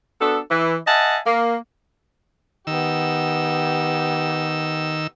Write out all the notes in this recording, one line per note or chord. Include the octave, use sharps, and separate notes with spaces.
B3 D4 F#4 A4
E3
D#5 E5 F#5 G#5 A5
A#3
D#3 B3 G4 E6